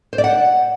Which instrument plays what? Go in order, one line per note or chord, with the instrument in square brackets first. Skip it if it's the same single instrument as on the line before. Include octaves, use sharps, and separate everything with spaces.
[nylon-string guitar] C5
D5
F#5